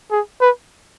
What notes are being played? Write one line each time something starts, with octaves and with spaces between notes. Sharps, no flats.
G#4
B4